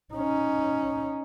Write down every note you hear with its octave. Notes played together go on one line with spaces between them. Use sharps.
C#4 D#4